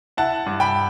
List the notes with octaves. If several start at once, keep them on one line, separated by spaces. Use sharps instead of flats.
E4 F#5 A5
G2
G5 B5